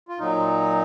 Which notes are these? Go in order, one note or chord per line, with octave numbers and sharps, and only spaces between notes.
F4
A#2 F#3 D#4